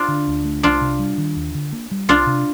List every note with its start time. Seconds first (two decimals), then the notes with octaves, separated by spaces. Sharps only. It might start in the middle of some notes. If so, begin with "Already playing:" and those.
Already playing: D4 F4
0.08 D3
0.28 D2
0.45 A3
0.63 C2 D4 F4
0.81 C3
0.99 G3
1.18 D#3
1.36 D#2
1.55 D3
1.72 A#3
1.91 G3
2.09 C2 D4 F4
2.27 C3